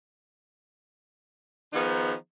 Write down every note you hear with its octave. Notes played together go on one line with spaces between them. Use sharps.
D#3 F3 B3 D#4 G#4